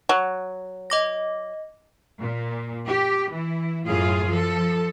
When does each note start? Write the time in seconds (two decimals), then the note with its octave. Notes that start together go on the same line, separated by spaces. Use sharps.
0.09 F#3
0.90 D#5 D6 A#6
2.20 A#2
2.86 G4
3.30 E3 E4
3.86 F#2 A2 F4 G#4 F5
4.30 F3 A4